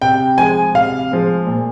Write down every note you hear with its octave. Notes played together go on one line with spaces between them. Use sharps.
C3 G5
F3 G#3 G#5
C3 F5
F3 G#3
A#2